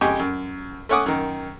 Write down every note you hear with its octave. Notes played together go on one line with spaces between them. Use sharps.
F2 C#3 G#3 G4 G#5 C#6
F#2
A3 C#4 C#5 F#5 D6 D#6
F#2 D#3